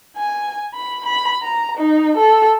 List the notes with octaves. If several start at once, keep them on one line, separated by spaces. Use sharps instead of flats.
G#5
B5
B5
A#5
D#4
A4